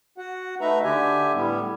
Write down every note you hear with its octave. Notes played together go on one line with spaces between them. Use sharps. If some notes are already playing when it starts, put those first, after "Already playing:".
F#4 F#5
A3 D#4 B4 E5 A#5
D3 G4 E5 G#5
A2 G3 B3